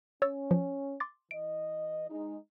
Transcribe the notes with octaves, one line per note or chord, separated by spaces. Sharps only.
C#4 C#5 E6 A6
F3
C6 D6 A6
E3 D#5 D7
G#3 D#4